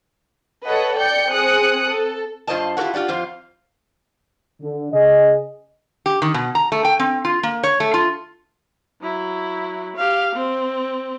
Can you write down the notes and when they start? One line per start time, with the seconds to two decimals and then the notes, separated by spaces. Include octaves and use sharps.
0.66 A4 B4 C#5 D#5 F#5
0.98 D5 G5 G6 C#7
1.30 C4 G#4 D#6 F#6 C#7
1.89 A4
2.47 G2 F4 C5 D5 D#5 A5
2.77 E4 F4 G4 A#4 C#5 F#5
2.94 F4 G4 D5 F#5
3.08 F2 F4 C5 F5
4.62 D3
4.93 C#3 G#4 D#5
6.06 G4
6.22 D#3
6.34 B2
6.55 A#5
6.72 A3
6.85 G5
6.99 C4
7.25 F4
7.43 A#3
7.63 C#5
7.80 A3
7.94 F4
9.01 F#3 E4
9.96 G4 F5
10.36 C4